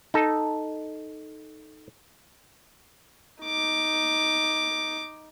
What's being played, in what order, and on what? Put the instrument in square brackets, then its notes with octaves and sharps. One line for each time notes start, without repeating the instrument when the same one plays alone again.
[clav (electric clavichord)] D#4 A4
[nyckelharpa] D#4 D6